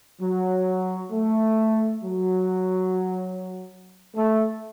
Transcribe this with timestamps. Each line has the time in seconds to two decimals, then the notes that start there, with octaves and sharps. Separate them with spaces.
0.22 F#3
1.12 A3
2.03 F#3
4.15 A3